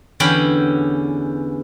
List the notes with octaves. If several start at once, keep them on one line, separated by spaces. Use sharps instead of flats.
E2 D3 C#4 G4 G5 B5